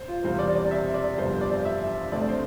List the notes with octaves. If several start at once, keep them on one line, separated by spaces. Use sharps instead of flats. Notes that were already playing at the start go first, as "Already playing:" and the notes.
Already playing: C5
F4
E1 E2 C3 G3 C4 C5
D5
D5
E5
D5
G1 F2 C3 G3 B3 C5
D5
E5
D2 D3 A3 C4 D5
C5